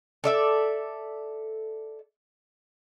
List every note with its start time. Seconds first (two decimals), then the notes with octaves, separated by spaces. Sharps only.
0.24 A4 D5 E5